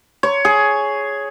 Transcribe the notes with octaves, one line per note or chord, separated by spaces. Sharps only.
C#5
G#4